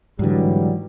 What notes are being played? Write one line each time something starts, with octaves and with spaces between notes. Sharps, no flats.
G#2 D3 E3 F#3 G3